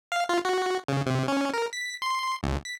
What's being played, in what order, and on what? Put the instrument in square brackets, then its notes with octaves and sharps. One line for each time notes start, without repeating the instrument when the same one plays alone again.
[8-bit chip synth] F5
F4
F#4
C#3
C3
C#4
A#4
B6
C6
C#2
B6